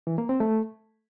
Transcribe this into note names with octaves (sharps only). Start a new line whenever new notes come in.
E3
A#3
C4
A3